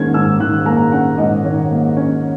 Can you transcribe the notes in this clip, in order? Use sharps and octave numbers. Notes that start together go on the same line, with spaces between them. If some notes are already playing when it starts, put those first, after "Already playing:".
Already playing: G#2 D#3 A#3 C#4 G#6
G#2 E6
D#3 F#6
A#3 A#5
C#4 F#5
G#2 D#5
D#3 C#5
A#3
C#4